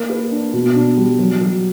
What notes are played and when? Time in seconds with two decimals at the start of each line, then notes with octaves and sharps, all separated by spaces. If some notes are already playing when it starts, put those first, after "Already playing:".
Already playing: A#3
0.10 B4
0.31 D4
0.53 B2
0.75 D4
0.97 G3
1.19 F#3
1.41 F#3